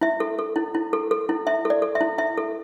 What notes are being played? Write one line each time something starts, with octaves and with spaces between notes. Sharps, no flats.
E4 E5
A4
A4
E4
E4
A4
A4
E4
E4 E5
A4
D5
A4
E5
E4
E4 E5
A4